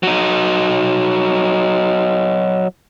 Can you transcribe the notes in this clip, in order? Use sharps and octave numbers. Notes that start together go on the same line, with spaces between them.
F#3 D#4